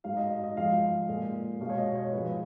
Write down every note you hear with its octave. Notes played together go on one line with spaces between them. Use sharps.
G#2 F#3 F5
D#5
D#5
D#5
G#2 F3 G#3 F5
A#2 G#3
B2 G#3 F5
C#5
D#5
C#5
G#2 F3 G#3 B4